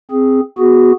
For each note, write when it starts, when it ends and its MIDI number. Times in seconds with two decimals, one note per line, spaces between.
0.11 0.40 60
0.11 0.40 68
0.58 0.92 59
0.58 0.92 66
0.58 0.92 68